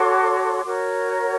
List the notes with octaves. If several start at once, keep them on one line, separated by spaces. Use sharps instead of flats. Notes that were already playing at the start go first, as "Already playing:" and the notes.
Already playing: F#4 A4 C#5 C6 D6
F#4 A#4 C#5